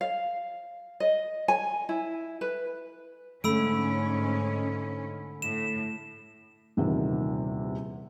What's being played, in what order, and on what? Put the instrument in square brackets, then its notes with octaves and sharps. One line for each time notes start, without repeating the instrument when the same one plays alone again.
[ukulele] F5
D#5
G#5
E4
B4
[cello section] G#2 C#4 [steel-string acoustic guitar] D3 A3 [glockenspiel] B5 E6 D7
[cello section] A2 [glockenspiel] E7
[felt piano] D#1 E2 C3 D#3